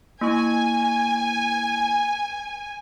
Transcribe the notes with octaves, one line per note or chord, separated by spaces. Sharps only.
A#3 E4 G#5 C#6